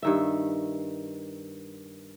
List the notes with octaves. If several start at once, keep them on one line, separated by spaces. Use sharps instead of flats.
G2 D#3 E5